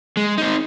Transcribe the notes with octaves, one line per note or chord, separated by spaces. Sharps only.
G#3
C4 D#4